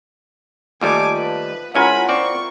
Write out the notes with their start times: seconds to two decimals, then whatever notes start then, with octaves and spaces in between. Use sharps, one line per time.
0.81 D#2 F3 G3 A3 G#5 A5 D6
1.16 B4
1.74 G#2 C#4 E4 F4 A#4 F#5 G#5 B5
2.09 C4 D5 C#6